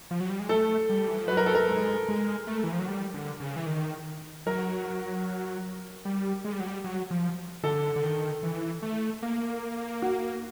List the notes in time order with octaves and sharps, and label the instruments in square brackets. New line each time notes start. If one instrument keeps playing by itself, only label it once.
[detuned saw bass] F3
F#3
G3
G#3
[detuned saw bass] A3 [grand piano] A4
[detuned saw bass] G3
E3
F3
[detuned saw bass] F#3 [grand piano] B4
[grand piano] A#4
A4
A#4
[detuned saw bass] G#3
G#3
A3
E3
F3
F#3
G3
D3
C#3
E3
D#3
[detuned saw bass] F#3 [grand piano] A#4
[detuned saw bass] G3
G#3
G3
F#3
G3
F#3
F3
[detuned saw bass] D3 [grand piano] A4
[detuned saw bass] D3
D#3
E3
A3
A#3
[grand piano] F#4